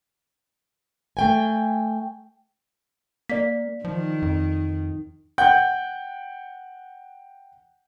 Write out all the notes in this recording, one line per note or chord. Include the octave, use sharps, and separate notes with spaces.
A3 G5 G#5
A#3 D5 B6
D#3 F3
F2
F#5 G5 G6